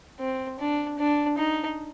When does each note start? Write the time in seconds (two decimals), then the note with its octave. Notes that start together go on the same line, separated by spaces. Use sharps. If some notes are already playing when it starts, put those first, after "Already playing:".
0.20 C4
0.60 D4
0.99 D4
1.38 D#4